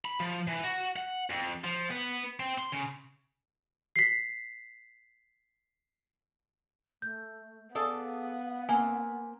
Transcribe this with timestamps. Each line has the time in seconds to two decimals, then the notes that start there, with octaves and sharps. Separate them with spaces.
0.05 B5
0.20 F3
0.48 E3
0.64 F#4
0.96 F#5
1.30 F2
1.64 F3
1.91 B3
2.40 C4
2.58 C6
2.72 C#3
3.96 B6 C7
7.02 A3 G6
7.75 B3 G#4 A4 D5 F5
8.69 A#3 C4 G#5